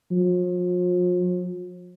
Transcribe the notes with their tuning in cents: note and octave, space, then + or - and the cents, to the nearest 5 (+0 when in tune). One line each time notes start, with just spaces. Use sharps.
F3 +40